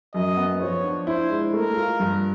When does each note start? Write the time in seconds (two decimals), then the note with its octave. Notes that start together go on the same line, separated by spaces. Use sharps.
0.14 F#2 D#5
0.37 B3
0.60 F3 C#5
0.84 D4
1.07 E4 C5
1.30 G#3
1.53 A3 A#4
1.76 F4
2.00 G2